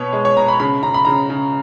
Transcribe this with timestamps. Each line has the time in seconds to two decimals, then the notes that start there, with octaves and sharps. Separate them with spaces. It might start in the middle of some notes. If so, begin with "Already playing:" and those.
Already playing: B2 B3 C#5
0.13 G#3
0.25 C#5
0.37 B2 A#5
0.48 B5
0.60 C#3 B5
0.83 C#3 A#5
0.94 B5
1.05 C#3 A#5
1.30 C#3